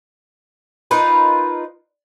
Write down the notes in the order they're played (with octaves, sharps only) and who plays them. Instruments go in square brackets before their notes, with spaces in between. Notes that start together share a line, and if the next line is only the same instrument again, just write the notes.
[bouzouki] D#4 F4 A#4 B4